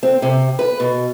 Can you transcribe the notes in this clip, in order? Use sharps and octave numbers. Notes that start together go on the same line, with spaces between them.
C4
C3
B4
B2